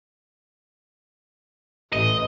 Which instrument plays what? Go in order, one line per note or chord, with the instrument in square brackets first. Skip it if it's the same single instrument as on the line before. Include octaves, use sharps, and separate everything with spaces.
[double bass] A1 [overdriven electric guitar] D#5